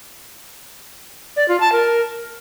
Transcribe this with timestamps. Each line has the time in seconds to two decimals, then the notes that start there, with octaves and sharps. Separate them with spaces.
1.36 D5
1.48 F4
1.60 A5
1.72 A#4